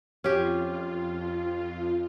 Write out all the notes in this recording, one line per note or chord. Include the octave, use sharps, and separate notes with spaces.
F2 C#4 F4 G4